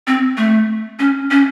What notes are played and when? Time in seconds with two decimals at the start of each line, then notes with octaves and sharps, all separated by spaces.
0.07 C4
0.37 A3
0.99 C#4
1.31 C#4